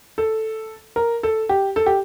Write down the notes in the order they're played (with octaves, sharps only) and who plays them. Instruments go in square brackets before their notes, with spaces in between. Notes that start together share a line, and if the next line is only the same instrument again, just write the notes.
[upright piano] A4
A#4
A4
G4
A4
G4